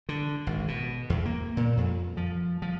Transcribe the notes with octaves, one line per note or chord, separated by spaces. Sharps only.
D3
G#1
B2
E2
A#3
A#2
F2
F3
F3